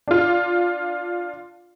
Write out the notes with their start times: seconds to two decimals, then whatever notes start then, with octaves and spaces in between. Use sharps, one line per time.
0.08 D4 F4